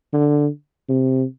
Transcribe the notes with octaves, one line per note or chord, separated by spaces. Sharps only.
D3
C3